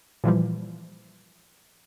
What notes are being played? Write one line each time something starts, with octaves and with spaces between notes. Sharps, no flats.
A#2 E3 F3 G3